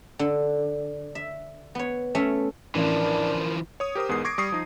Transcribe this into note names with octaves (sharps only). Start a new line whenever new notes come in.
D3
E5
B3 C#5
A3 C#4 E5
A1 E3 F3 D4 A#4
C#5 D#6
G4 A#4 C5 D#6
E2 G#2 B3 G#4 A#4 C7
C#6 D6 G#6 A#6 C7 D7
G3 C#6 D#6 C7
F3 D#4